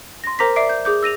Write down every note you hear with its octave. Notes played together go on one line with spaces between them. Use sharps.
C6 A#6
A#4 C5 A#5 D6 A#6 B6
D5 E5 D6 C7 D7
G6
G#4 D6 G6
E6 A#6 D#7 F7